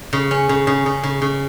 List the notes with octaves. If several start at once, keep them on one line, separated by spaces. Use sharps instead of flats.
C#3
C#4
C#3
C#3
C#3
C#3
C#3